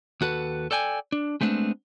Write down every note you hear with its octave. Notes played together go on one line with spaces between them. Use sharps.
D#2 F#4 A4 B4
A4 D5 G5 G#5
D4
G#3 A3 B3 C4 D4